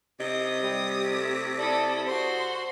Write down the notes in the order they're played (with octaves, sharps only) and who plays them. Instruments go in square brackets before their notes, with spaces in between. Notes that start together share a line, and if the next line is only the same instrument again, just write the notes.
[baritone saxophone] C3 [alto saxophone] D#5 [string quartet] D#6
[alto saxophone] G3
A3
[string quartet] E4 A4 D#6 [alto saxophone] D5
[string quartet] F#4 C6 [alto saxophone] C5